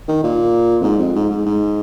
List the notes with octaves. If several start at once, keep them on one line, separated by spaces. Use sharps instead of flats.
D#3
A#2
F2
G#2
F2
G#2
G#2
G#2